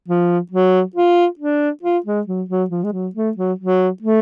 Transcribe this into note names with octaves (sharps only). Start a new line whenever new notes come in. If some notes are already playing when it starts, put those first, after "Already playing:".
F3
F#3
F4
D4
F4
G#3
F#3
F#3
F3
G#3
F#3
A3
F#3
F#3
A3